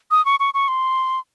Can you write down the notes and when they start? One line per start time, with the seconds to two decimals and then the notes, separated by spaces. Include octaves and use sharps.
0.11 D#6
0.25 C#6
0.40 C#6
0.54 C#6
0.68 C6